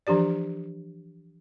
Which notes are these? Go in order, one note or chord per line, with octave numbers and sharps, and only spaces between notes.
E3 F3 D4 G4 D5